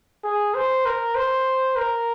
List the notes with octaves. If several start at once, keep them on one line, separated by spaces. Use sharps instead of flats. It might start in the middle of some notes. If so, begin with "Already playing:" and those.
G#4
C5
A#4
C5
A#4